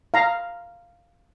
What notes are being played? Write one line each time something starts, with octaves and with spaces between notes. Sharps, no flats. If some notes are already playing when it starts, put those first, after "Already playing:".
F5 A#5